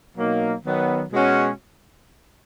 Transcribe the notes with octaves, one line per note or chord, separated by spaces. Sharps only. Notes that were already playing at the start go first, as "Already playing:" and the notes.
B2 F#3 A#3 D#4
D#3 F#3 B3
B2 G#3 C#4 F#4